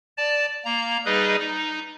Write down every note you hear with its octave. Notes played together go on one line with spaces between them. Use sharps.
D5 A5
A#3 A#5
G3 D#4 G#4 B4 D#5
D#4